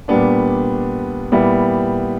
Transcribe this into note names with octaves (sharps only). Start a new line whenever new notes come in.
A#2 G3 B3 D4
A#2 G3 B3 E4